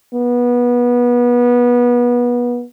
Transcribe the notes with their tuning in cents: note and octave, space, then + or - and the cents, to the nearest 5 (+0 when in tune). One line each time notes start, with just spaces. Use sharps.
B3 -25